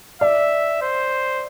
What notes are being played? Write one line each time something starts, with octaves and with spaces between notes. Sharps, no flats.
D5 E5
C5